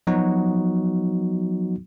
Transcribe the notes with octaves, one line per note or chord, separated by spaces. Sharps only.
F3 F#3 B3 D#4 F#4